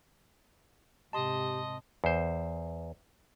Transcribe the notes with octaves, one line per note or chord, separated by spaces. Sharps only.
G#2 C3 G4 D#5 A5 C6
E2 C5